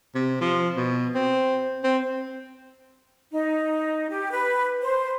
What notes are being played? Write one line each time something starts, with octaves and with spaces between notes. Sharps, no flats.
C3
F3
B2
C4
C4
D#4
G4
B4
C5